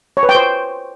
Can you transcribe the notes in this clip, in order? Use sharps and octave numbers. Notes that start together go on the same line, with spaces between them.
C#5
B4
G5
C5